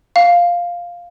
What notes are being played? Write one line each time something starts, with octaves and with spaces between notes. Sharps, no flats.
F5